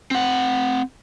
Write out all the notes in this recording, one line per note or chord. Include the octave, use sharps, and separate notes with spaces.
C4 F#5